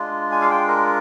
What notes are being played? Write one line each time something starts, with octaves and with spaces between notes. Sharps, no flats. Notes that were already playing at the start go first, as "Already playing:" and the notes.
Already playing: G#3 D4 F4
G#5
F5
G5
A#4